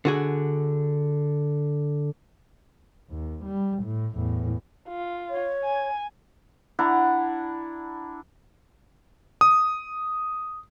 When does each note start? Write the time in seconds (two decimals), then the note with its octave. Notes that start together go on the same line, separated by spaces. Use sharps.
0.05 D3 F#4 G#4
3.10 D#2
3.45 G3
3.84 A2
4.15 E2 A2
4.88 F4
5.30 C#5
5.64 G#5
6.79 D4 E4 F#5 A#5
9.41 D#6